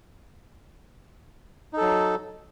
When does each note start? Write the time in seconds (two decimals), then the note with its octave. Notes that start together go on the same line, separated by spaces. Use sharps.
1.73 D#4
1.77 A4
1.81 F#3